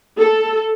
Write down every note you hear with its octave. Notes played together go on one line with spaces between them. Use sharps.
A4